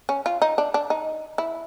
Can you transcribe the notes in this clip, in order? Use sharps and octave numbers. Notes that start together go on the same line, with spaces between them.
C#4
F4
D#4
D4
D4
D#4
E4